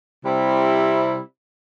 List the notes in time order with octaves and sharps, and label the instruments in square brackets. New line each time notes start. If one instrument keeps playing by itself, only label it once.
[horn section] C3 G3 C4 E4